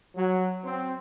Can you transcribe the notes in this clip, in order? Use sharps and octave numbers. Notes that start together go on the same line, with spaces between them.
F#3
C4